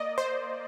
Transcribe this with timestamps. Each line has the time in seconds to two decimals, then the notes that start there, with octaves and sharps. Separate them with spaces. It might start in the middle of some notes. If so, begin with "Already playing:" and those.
Already playing: A#3 D5 D#5
0.18 C5